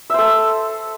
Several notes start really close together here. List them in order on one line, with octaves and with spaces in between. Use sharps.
E5 C5 A4